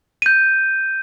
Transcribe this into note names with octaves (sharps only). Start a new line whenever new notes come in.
G6 D#7